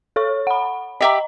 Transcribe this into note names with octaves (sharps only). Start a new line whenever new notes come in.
A4 C#5 C#6
F#5 B5
G4 D#5 E5 A#5 D6